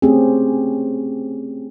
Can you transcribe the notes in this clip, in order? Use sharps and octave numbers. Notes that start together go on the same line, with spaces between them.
A3 C4 C#4 G4 G#4